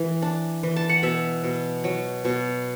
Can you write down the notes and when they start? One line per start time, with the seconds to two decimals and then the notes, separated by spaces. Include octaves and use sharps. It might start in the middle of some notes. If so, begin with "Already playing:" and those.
Already playing: E3
0.22 D4
0.63 E3
0.76 A5
0.89 F#5
1.03 B2 E5
1.44 B2
1.84 F#3
2.25 B2